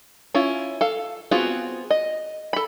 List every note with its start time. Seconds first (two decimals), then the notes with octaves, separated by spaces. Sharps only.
0.34 C#4 E4 F4
0.81 A4 F5
1.31 B3 C4 F4 F#4 G#4
1.90 D#5
2.53 A4 B5